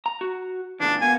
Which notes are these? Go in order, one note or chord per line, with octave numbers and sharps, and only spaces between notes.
A#5
F#4
A#2 C#3 E3 D4
B2 A#3 B3 G#5